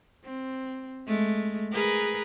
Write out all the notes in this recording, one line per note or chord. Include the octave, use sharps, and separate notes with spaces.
C4
G#3 A3
G#4 A#4 B4